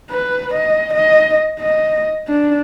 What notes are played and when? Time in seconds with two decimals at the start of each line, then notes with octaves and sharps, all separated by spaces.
0.10 B4
0.54 D#5
0.94 D#5
1.60 D#5
2.28 D4